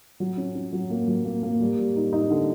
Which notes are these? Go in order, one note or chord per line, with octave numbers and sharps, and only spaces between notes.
F#3
C#4
C#4
F#3
A#3
F#3
A#3
A#3
G3
G3
D#4
D#4
D3